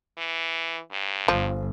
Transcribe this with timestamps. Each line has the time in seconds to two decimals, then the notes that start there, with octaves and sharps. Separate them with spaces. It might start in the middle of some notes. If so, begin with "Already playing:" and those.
0.18 E3
0.92 G2
1.28 G1 F3